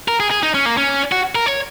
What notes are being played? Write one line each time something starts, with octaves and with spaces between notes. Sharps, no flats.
A#4
G#4
G#4
D#4
C#4
A#3
C#4
F#4
A#4
C#5